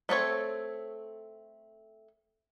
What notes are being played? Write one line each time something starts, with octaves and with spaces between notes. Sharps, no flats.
A3 C4 A4 C#5